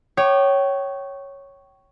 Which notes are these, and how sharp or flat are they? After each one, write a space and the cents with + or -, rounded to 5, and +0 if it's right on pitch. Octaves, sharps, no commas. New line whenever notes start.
C#5 +0 G5 -30 D6 +40